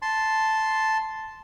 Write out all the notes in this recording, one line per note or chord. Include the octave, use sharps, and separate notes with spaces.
A5 C6